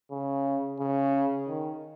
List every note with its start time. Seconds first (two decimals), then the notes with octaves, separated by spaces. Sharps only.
0.11 C#3
0.79 C#3
1.48 D#3